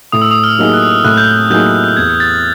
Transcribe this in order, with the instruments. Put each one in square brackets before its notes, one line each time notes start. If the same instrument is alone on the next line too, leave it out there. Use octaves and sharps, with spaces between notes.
[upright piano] A2 [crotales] D#6
[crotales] E6
D#6
F6
[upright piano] F#3 A#3 D#4 G#4
[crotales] F#6
[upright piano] A2 [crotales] F#6
[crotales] G6
F#6
[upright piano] F#3 A#3 D#4 G#4 [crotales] G6
[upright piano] E2 [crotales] G#6
[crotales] A6